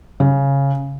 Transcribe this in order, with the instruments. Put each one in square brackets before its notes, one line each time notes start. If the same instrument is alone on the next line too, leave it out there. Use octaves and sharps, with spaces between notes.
[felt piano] C#3